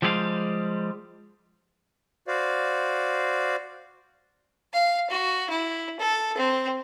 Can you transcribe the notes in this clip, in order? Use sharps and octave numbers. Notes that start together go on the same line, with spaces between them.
F3 G3 G#3 E4 G4 F5
F#4 C5 D5 F5
F5
F#4
E4
A4
C4